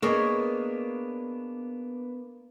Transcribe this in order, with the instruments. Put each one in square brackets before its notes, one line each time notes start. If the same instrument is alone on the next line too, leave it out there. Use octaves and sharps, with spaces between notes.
[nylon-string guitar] A#3 D#5 [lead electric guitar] B3 D4 [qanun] G#4 A#4 C#5